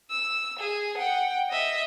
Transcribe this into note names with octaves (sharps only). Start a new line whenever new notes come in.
E6
G#4
F#5 G5
D#5 E5